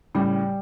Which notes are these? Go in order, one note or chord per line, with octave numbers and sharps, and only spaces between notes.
A2 C#3 G3